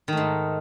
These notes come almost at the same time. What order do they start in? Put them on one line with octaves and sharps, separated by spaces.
D#3 A3 G#2